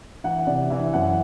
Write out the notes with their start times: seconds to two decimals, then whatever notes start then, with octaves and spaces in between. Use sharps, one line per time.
0.24 E3 F#5
0.47 C3 D5
0.70 E3 E5
0.93 F#2 F#5